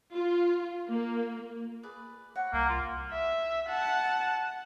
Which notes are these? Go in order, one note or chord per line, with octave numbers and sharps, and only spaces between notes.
F4
A#3
G#4 B4 D5
F#4 C#5 F#5
C2 A#3
F4
E5
F#5 A5